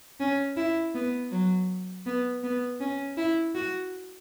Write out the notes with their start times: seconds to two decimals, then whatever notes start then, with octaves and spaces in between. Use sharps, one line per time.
0.20 C#4
0.57 E4
0.95 B3
1.32 F#3
2.06 B3
2.43 B3
2.81 C#4
3.17 E4
3.55 F#4